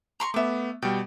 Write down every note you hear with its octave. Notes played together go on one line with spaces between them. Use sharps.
A#5 C6 C#6
A3 B3 E5 D6
B2 G3 G5